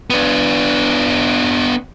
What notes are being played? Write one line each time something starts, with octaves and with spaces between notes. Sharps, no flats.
B3 D4